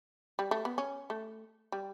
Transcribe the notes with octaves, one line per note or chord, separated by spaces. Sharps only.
G3
A3
B3
C#4
A3
G3